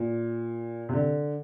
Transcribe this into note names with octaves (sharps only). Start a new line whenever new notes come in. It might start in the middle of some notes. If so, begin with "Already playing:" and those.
Already playing: A#2
C3
D3